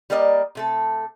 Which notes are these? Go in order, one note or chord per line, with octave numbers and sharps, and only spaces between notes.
G3 A#3 A#4 D5 D#5
C3 A3 A4